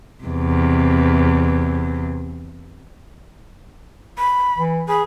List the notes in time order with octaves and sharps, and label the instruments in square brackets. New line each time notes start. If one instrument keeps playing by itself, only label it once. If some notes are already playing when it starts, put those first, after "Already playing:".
[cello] E2 C3
[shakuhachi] B5
[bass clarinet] E3
[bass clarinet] G#4 [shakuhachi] B5